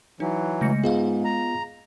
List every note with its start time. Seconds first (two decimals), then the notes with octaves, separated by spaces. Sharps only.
0.20 E3 F#3 D#4
0.61 C#3 G#3 A3 A#6 C#7
0.84 G#2 B3 F4 G#4 D#5 F5
1.25 A#5